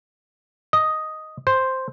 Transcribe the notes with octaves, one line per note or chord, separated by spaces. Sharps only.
D#5
C5